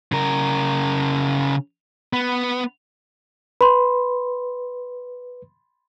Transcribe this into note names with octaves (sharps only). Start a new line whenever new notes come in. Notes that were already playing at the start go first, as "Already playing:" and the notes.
C#3 A#4
B3
B4 B5 C6